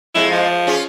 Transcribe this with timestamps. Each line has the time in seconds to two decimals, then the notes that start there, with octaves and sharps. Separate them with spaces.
0.15 F2 G#3 E4
0.32 F3
0.67 C#4 F4 G#4